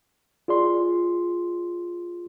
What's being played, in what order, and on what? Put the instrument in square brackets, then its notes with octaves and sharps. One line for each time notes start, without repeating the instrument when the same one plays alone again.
[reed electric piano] F4 G#4 D5 C6